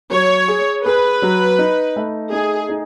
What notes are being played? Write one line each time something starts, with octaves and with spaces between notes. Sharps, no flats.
F#3 C#5
G#4
G#4 B4
F#3
D#4
A3
D#4 G#4
D#4